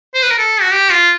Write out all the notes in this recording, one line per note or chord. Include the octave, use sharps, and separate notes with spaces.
C5
B4
A#4
A4
F#4
G4
F4